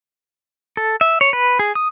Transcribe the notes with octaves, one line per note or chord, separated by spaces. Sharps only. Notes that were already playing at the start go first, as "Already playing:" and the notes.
A4
E5
C#5
B4
G#4
D#6